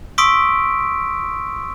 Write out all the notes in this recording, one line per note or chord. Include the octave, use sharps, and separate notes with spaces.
C6 C#6 D#6 E6 B6 D7